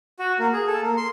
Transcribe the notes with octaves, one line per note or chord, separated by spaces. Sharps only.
F#4
A#3
G#4
A4
A#3
C6